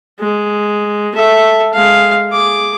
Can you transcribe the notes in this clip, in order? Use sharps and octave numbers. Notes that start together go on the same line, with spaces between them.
G#3
A4 E5
G#3 F5
G#4 D6